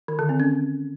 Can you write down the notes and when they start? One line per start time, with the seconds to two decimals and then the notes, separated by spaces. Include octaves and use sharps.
0.08 D#3
0.19 D3
0.29 C4
0.40 C#4